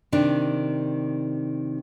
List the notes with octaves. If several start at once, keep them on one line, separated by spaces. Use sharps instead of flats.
C3 D#3 D4